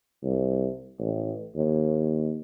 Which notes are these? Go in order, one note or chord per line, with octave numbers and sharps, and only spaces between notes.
C2
A1
D#2